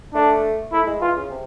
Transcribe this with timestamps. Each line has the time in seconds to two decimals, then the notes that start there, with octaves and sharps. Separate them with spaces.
0.15 A3 D4
0.73 A3 E4
0.87 G#3
1.02 E3 F4
1.16 C#3
1.30 C3